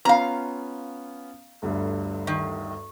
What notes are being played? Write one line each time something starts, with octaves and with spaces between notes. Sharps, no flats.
B3 C#4 F4 F5 A#5
G1 D2 G2
D#3